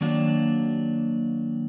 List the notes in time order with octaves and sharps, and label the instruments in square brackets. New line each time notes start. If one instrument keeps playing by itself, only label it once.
[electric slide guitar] D#3 F#3 A#3 D4 F#4